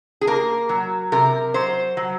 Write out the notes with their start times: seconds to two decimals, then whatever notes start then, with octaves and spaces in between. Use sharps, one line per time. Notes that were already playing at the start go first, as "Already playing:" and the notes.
0.21 G#4
0.27 A#3 A#4
0.69 F#3
1.12 C3 A#4
1.54 F#3 C5
1.97 F#3